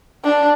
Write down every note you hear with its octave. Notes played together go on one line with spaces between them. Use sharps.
D4